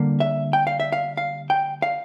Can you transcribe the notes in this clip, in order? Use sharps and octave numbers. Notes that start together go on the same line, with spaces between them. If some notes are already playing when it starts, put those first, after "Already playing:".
Already playing: D3 G3 A#3
E5
G5
F5
E5
F5
F5
G5
F5